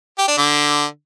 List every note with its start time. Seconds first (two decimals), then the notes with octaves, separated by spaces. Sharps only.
0.18 G4
0.28 D4
0.37 D3